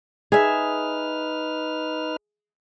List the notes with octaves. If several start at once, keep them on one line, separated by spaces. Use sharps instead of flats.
D#4 G#4 B4 E5 F6